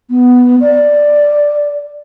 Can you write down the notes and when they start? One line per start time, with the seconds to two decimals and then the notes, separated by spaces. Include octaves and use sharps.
0.10 B3
0.61 D5